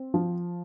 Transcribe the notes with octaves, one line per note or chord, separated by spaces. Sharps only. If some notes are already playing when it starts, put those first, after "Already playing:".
Already playing: C4
F3